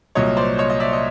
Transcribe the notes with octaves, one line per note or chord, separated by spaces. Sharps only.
C2 A#2 F#3 C#5 D#5
C5 D5
C#5 D#5
D#5
D5 E5
D#5